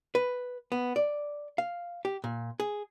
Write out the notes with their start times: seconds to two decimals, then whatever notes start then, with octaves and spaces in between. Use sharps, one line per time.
0.15 B4
0.72 B3
0.96 D5
1.58 F5
2.05 G4
2.24 A#2
2.60 G#4